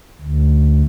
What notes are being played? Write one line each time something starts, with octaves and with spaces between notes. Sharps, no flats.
D2